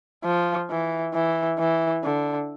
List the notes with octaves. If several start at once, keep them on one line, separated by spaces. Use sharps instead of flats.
F3
E3
E3
E3
D3